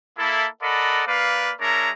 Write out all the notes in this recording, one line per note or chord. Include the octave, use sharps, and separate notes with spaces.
A#3 E4 A4
A4 A#4 D5 D#5 F#5 B5
A#3 B4 D5 F5
G#3 D4 A#4 C#5 E5 A#5